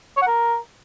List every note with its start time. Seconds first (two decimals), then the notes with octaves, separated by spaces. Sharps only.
0.17 C#5
0.22 F#5
0.27 A#4